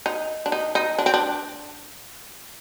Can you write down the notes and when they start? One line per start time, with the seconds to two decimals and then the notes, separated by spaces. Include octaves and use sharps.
0.06 D#4
0.46 D4
0.52 D#4
0.75 D#4
0.98 D4
1.06 C4
1.14 D4